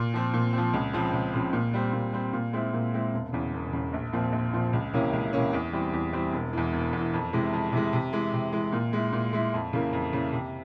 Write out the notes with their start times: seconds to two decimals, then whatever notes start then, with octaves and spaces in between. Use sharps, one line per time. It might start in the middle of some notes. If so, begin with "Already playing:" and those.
Already playing: A#2
0.14 F3 C4
0.34 A#2
0.53 F3 C4
0.73 C#2
0.93 C#3 F3 C4
1.13 C#2
1.33 C#3 F3 C4
1.53 A#2
1.73 G3 C4
1.93 A#2
2.13 G3 C4
2.33 A#2
2.53 G#3 C4 E4
2.73 A#2
2.94 G#3 C4 E4
3.13 E1
3.33 E2 C#3
3.53 E1
3.73 E2 C#3
3.93 A#1
4.13 A#2 F3 C4
4.32 A#1
4.53 A#2 F3 C4
4.73 C#2
4.93 C3 E3 A#3 C#4
5.13 C#2
5.33 C3 E3 A#3 C#4
5.53 E2
5.73 E3 G3 C4
5.93 E2
6.13 E3 G3 C4
6.32 E1
6.53 E2 E3
6.73 E1
6.93 E2 E3
7.13 F2
7.33 C3 E3 G#3
7.53 F2
7.72 C3 E3 G#3
7.93 C3
8.13 E3 G#3
8.33 C3
8.52 E3 G#3
8.73 A#2
8.93 G#3 E4
9.13 A#2
9.33 G#3 E4
9.54 F2
9.73 C#3 E3 A#3
9.93 F2
10.13 C#3 E3 A#3
10.33 C3